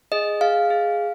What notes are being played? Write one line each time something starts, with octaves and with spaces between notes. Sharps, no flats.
G#4 D#5
G#4 F5
G#4